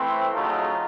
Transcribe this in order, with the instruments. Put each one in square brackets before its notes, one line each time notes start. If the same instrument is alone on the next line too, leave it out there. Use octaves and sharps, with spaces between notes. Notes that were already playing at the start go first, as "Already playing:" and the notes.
Already playing: [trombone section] E3 A3 C4
C#3 F#3 A3 D#4 F4